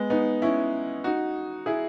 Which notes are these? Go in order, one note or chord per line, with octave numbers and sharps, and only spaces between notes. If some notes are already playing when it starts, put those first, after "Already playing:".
Already playing: G#3 B3
B3 D#4
C#4 E4
D#4 F#4
E4 G#4